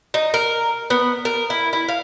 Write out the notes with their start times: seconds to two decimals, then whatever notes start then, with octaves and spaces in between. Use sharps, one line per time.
0.14 D#4
0.34 A#4
0.90 B3
1.25 A#4
1.50 E4
1.73 E4
1.89 F5